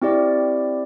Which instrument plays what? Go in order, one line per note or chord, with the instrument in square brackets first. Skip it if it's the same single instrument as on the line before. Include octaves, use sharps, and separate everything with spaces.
[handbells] C4 E4 G4 D5